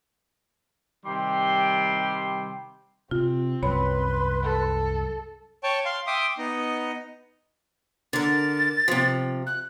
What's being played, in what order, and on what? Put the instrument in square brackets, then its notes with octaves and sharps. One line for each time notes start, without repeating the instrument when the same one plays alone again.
[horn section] C3 D#3 G3 G5 C6
[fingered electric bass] C3 [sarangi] C4 [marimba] F4
[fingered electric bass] C2 F#2 [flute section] B4 C6 [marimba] C#5 B5
[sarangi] A4
[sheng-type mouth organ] C#5 G5 A5 C#6
F5 C6
E5 G5 C6 D6 D#6
B3 D#4 D#5
[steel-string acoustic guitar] D3 A#4 [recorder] A6
[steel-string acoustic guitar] C3 F3
[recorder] F#6